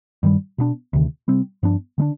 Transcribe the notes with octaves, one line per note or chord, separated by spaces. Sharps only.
G2 D#3 G3
B2 B3 D4
D2 C3 D#3
C3 G3 C4
G2 F3 B3 D4
D3 G#3 D4